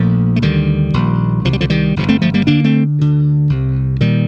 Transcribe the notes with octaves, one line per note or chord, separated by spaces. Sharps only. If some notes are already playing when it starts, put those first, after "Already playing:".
Already playing: A#1 A#2 F3 A3
A3
D2 D3 D#3 G3
A#1 A#2
C2 C3 F3
G3
D3 F3
D#3 G3
G1 F2 C3
A3 C4
F3 A3
G3 A#3
D2 D3 A#3 D4
A3 C4
D2 D3
C2 C3
A#2 D#3 G3